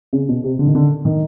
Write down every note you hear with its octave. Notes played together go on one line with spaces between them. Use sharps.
C#3
B2
C3
D3
D#3
D3
D#3